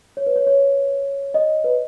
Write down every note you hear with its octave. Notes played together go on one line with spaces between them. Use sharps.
C#5
B4
C#5
C#5
D#5
B4